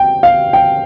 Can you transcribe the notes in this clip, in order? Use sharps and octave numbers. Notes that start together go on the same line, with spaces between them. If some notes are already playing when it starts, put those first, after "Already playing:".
Already playing: G5
F5
G5